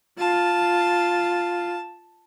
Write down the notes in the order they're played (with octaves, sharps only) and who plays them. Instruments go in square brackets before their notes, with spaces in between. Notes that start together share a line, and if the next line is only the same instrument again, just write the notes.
[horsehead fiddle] F4 [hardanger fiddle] A5